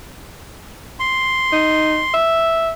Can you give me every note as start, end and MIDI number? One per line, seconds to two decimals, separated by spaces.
1.00 2.14 84
1.52 2.01 63
2.14 2.71 76